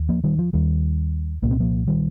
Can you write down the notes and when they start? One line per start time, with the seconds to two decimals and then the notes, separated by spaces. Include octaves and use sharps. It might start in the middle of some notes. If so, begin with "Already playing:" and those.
Already playing: D#2
0.09 F3 A#3
0.24 D#3 G3
0.39 F3
0.53 D#2 D#3 G3
1.42 C2 A#2 A#3
1.51 C4
1.60 F3 A#3
1.88 D#3 G3